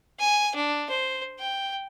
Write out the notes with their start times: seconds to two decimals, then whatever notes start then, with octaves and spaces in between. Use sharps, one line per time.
0.20 G#5
0.55 D4
0.90 C5
1.39 G5